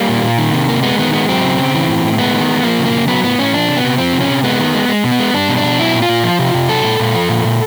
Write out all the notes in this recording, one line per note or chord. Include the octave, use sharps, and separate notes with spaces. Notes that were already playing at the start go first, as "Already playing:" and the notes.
Already playing: G3 A#3
A#2
A#2
D#3
C3
A#3
G#3 B3
D#3 B3
G#3 B3
F#3 C4
C#3
C#3
E3
A2
A2
G#3 B3
D#3
G#3
F3 A#3
C#3
A#3
C#3
F#3 B3
A2 B3
A2 C#4
F3 D4
C3
B3
C3
F3 C4
C3
C#4
C3
G#3 B3
D#3
G#3
G#3
B2
B3
G#3
G3 D4
B2
D4
B2
F#3 E4
A#2
F4
A#2
F3
C3
C3
F#3 A4
A#2
A#2
F3
A#2
A#2